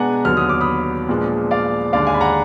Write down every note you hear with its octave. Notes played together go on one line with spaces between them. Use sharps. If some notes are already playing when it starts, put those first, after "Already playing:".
Already playing: B2 G#3 B3 D4 F#5 G#5 A#5
D#2 D3 F#3 B3 F6
D#6
D6
B5 D#6
A#2 F3 G#3 B3 D4
D5 F5
D#2 D3 G#3 D4 D5 F5
F5 G#5
B5
F#5 A#5